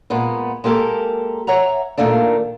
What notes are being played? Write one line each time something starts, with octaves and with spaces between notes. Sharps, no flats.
A#2 G#3 B3
G#3 A#3 G4 A4 A#4
C#5 E5 F#5 A#5
A#2 D#3 A3 A#3 D4